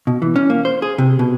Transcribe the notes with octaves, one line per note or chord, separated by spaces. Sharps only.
B2
E3
C#4
A#3
C5
G#4
C3
B2